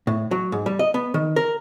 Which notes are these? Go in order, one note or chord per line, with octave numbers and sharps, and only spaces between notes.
A2
F#3
G#2
G3
D#5
B3
D#3
A#4